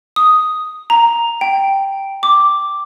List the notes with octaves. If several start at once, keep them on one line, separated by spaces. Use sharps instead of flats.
D#6
A#5
G5
D6